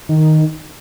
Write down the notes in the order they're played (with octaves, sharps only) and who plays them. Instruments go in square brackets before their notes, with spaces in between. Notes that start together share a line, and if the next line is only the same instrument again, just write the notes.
[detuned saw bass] D#3